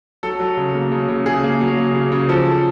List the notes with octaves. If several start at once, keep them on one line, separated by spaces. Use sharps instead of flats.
F#3 A4
F#3
C#3
A#3
C#3
C#3
C#3 G#4
A#3
F#3
C#3
C#3
C#3
F3 A4